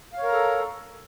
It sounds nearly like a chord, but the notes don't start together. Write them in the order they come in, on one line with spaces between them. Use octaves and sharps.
F5 C#5 A#4 A#5 A4